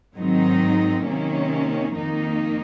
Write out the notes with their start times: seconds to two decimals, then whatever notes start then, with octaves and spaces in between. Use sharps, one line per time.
0.18 G#2 D#3 F#3 C4 D#4
1.07 C3 D#3 A#3 C#4
1.95 F2 D#3 A#3 D#4